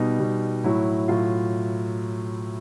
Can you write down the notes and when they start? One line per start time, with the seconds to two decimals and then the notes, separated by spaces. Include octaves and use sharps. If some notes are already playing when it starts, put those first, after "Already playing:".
Already playing: B2 G3 D#4
0.19 B2 G3
0.64 A2 F#3 E4
1.08 A2 F#3 F4